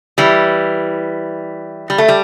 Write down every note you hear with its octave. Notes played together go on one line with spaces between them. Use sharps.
E3 G3
G3
A3
G3